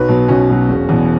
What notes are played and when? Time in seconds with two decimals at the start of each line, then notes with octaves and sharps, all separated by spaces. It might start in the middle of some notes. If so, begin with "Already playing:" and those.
Already playing: B1 F#4 B4
0.08 B2 F#3
0.28 B1 C#4 F#4
0.49 B2 F#3
0.69 E1
0.89 E2 B2